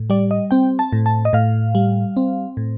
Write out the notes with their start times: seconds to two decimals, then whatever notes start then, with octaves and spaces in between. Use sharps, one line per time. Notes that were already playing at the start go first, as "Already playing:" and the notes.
Already playing: A2
0.10 G3 D5
0.31 D#5
0.51 C4 G5
0.79 A5
0.93 A2
1.06 A5
1.25 D#5
1.33 A2 F5
1.75 G3
2.17 C4
2.57 A2